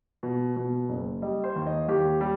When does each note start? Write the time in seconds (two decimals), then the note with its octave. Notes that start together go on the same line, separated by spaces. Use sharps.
0.23 B2
0.56 B2
0.89 F#1
1.22 G3 D#5
1.44 C5
1.56 D#2
1.67 D#5
1.88 D#2 G4
2.21 G3